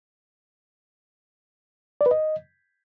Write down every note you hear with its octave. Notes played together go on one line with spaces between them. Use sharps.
D5
B4
D#5